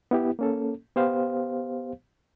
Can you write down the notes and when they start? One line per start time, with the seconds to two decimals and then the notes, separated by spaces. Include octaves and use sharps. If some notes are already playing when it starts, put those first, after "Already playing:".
0.11 B3 E4 G4
0.39 A#3 C#4 A4
0.96 B3 G4 C5 F5